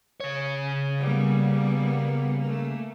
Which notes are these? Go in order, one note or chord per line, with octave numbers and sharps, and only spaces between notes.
C#3 C#5
G3 A#3 B3
A3 A#3